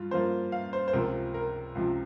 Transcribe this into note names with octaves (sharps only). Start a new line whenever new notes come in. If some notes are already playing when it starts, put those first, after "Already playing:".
Already playing: G2 F4
G2 F3 A#3 F4 C5
F5
C5
C5
C#2 C3 F3 A#4
A#4
C#2 C3 F3